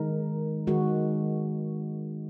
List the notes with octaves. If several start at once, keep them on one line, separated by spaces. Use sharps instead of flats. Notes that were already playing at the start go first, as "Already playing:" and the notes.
Already playing: D#3 G#3 A#4
D#3 G#3 F#4